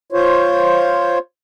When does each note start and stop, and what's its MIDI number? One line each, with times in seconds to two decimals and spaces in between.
0.12 1.18 65
0.12 1.18 72
0.12 1.18 73